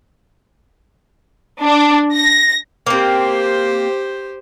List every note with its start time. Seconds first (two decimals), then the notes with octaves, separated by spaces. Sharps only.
1.63 D4
2.15 A#6
2.87 A#3 C4 G4 C5